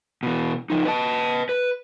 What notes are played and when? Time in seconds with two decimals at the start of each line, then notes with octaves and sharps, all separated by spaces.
0.23 B2 E3
0.70 F3 D#4
0.85 B4 D#5 A5
1.49 B4